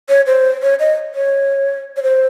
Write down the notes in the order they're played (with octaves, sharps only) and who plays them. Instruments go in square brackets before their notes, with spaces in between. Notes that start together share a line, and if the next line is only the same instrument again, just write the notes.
[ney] C#5
C5
C#5
D#5
C#5
C#5
C5